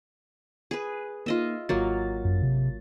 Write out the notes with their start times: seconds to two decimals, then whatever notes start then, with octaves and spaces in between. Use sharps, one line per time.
0.71 G#4 B4
1.26 A#3 D#4 F4 D#5 E5
1.69 G#1 F#3 A#3 F4 A6
2.25 F#2
2.43 C3